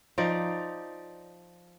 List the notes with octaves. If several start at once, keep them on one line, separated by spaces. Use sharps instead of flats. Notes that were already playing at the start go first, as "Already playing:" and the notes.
F3 D#4 D5